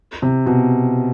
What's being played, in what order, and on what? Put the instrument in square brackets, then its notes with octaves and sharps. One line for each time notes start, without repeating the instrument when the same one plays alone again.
[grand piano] C3
B2